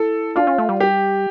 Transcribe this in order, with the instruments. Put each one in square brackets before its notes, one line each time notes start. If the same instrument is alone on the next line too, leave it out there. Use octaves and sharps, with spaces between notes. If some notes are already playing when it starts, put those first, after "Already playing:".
Already playing: [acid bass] E4 [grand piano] A4
[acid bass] D4 [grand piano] F4
[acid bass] C#4
A3
G3
[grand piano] G4